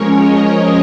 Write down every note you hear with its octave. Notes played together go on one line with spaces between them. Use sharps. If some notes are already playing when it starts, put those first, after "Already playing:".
Already playing: F3 G#3 C#4 A#4 C#5
D#5